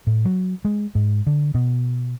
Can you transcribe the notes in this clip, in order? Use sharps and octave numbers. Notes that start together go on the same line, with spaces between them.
A2
F#3
G#3
G#2
D3
B2